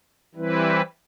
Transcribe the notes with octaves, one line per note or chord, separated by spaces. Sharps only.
E3 G3 C4 E4 B4